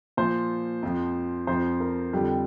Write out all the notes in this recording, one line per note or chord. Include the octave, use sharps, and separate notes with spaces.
A#2 F3 C5
F2 F3
F2 F3 C5
A#4
F2 D3 G3 G4